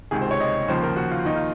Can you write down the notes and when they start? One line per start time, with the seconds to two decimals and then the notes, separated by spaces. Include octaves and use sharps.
0.11 C#2 C3 D#3 G#4
0.21 C5
0.31 C#5
0.40 D#5
0.68 D#2 C#3 F3 C5
0.83 A#4
0.96 F#4
1.11 F4
1.25 D#2 D#3 D#4
1.36 F4